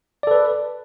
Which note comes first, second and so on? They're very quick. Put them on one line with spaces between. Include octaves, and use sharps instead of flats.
D5 A4 B4